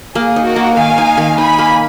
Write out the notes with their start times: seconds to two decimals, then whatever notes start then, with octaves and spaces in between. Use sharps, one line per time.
0.15 A#3 G#4
0.36 D#4
0.46 F#4 A#4
0.56 A#3
0.76 D#3 F5 G#5
0.98 D#4
1.17 D#3
1.38 D#4 G#5 B5
1.59 A#3